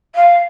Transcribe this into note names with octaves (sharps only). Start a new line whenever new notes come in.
F5